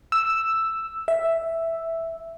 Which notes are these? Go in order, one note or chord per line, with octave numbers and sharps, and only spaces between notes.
E6
E5